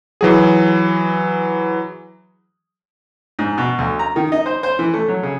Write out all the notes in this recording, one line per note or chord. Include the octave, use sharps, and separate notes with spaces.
E3 F#3 G#4
G#2
B2
D2
A#5
D#3
D#4
C5
C5
E3
A3
F#3
C#3